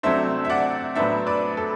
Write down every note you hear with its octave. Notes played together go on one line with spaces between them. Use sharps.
C3 F#3 A3 D4 C5 E5
E5
D5 F#5
A2 F#3 B3 D4 C5 E5
B4 D5
A4